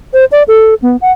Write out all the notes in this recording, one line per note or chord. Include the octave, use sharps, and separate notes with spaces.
C5
D5
A4
B3
F#5